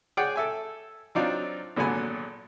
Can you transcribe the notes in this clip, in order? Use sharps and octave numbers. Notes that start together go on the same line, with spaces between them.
G#4 C#5 D5 F#5 G5
A4 E5 G#5
F#3 C4 D4 D#4 F4
G#1 A#2 D3 F#3 B3 G#5